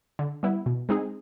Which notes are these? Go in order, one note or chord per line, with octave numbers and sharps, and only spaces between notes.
D3
G3 B3 E4
B2
G#3 C4 D#4 G#4